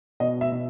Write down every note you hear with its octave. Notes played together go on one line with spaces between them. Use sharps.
B2 D#5
E5
B2